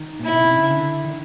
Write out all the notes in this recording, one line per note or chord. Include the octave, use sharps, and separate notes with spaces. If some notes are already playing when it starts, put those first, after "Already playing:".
Already playing: D#3
A#2 E4
B2
C3
C#3
D3
D#3